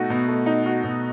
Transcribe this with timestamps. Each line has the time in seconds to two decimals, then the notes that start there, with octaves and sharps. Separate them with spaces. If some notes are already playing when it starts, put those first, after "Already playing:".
Already playing: B2 A3 D#4 F#4
0.10 B2
0.28 A3
0.46 D#4
0.66 F#4
0.84 B2